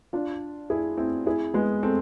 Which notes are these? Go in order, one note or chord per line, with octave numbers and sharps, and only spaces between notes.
D4 F4
E4 G#4
C4 E4
E4 G#4
G#3 B3
A3 C4